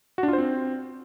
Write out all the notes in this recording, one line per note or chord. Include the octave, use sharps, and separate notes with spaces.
F#4
D4
F4
C5
C4